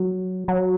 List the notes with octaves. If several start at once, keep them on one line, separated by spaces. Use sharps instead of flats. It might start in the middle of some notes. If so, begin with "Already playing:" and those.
Already playing: F#3
F#3